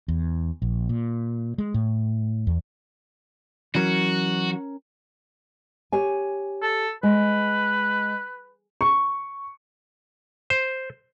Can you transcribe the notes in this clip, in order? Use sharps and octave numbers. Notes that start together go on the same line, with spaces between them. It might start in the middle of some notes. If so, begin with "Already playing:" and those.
E2
A#1
A#2
G#3
A2
E2
E3 F#3 C#4 F#4 A#4
G4 C#5 G#5
A4
G#3 B4
C#6
C5